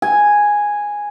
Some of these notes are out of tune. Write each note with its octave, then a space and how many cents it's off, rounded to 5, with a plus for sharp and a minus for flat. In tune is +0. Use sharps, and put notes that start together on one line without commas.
G#5 -5